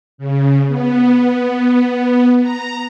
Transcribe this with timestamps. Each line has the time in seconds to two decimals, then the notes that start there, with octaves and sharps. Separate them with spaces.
0.18 C#3
0.67 B3
2.42 A#5